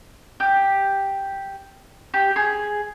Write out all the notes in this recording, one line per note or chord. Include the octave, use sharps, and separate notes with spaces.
G4
G4
G#4